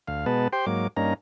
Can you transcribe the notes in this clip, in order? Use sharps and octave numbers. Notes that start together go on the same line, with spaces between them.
D2 F5
B2 G#3 B3 B4 A5
G4 C5 G5 C6
G#2 F#3 A#3 D6
G2 A#3 C#4 D#4 A#5